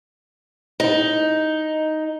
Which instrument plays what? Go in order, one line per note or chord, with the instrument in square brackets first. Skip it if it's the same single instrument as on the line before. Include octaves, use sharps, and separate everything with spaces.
[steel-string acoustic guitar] D#4